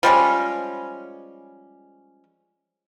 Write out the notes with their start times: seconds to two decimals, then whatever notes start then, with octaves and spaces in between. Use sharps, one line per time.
0.03 F3 G3 G#3 C#4